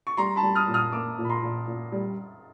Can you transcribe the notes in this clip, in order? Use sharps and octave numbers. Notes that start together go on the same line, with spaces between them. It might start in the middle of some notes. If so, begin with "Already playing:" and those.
C#6
G3 A#5 C6
A5 B5
G3
D#6 F6
A#2
D#6 F6
A#3 D6 E6
A#2
B5
A#5 C6
A#2
A#2
G3